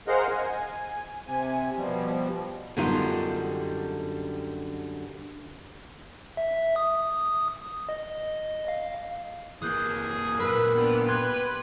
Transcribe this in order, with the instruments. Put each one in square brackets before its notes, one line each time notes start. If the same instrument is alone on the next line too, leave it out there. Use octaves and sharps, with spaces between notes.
[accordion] G#4 A#4 C5 D#5 F5 F#5
G#5
C3 G#5
B2 F3 G3
[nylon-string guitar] F#2 D3 G3 B3 D#4 F4
[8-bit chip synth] E5
D#6
D#5
F5
[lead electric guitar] E3 A#3 [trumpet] G#4 [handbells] D#6 F#6 G6
[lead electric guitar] F#2 A#2 [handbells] A#4 B5 E6 [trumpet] B4
[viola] B3 D4 [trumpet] G4
[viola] B4 [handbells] C6 F#6 G#6